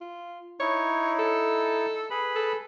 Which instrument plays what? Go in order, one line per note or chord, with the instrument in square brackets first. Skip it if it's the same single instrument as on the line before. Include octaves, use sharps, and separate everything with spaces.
[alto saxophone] F4
[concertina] D#4 E4 [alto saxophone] C#5
[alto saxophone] A4
[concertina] G#4 B4 B5
[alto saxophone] A4